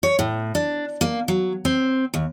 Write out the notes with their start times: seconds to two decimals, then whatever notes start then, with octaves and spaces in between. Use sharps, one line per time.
0.03 C#5
0.19 A2
0.55 D4
1.01 A#3
1.28 F#3
1.65 C4
2.14 D#2